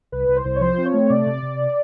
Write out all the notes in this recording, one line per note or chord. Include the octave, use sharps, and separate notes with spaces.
C2 B4
C2
C5
C2
C#5
F3 C5
C4
C#5
A3
C3 D5
C3
C3